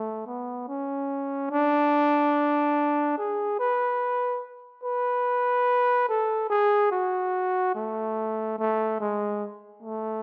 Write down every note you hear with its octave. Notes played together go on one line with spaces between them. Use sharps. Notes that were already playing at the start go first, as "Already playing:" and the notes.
Already playing: A3
B3
C#4
D4
G#4
B4
B4
A4
G#4
F#4
A3
A3
G#3
A3